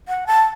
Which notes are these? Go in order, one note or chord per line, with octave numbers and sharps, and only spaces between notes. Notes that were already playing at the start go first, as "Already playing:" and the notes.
F#5
A5